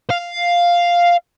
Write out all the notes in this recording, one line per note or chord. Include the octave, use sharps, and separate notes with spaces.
F5